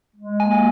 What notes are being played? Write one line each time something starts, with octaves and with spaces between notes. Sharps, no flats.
G#3
A#3 G#5